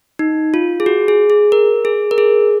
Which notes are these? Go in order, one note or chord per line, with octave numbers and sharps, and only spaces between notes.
D#4
F4
G#4
F#4
G#4
G#4
A#4
G#4
A#4
G#4